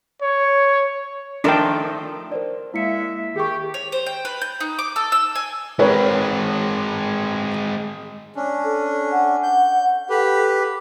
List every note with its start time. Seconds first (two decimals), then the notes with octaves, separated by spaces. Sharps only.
0.22 C#5
1.44 D#3 F3 A3 D4 A#4 G5
2.32 A#4 C5 D5
2.74 G#3 A#3 E4 E5 C#7
3.36 D#3 G4 G#4 C#6
3.74 C#5
3.92 C5
4.06 G5
4.25 B4
4.42 G6
4.61 D#4
4.79 D6
4.96 A4
5.12 E6
5.35 G#5
5.79 G#3 C4 A#4 B4 C#5
8.36 C#4 D4
8.64 A4
9.12 F#5
9.43 G6
10.09 G4 A4 B4